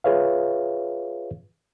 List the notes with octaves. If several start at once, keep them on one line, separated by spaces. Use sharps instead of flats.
F4 G#4 B4 C#5 E5 F5